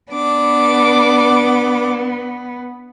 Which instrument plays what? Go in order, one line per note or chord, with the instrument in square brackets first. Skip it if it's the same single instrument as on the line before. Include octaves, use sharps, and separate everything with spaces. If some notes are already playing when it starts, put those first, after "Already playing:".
[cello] B3 [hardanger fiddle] D4 D6